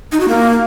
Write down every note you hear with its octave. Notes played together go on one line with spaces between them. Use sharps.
D#4
F#4
A#3